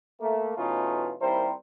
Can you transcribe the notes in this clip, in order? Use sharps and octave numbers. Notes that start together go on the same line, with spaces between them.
A3 A#3
B2 E3 A3 C#4 D#4 F4
D#2 G3 C4 E4 A#4 C5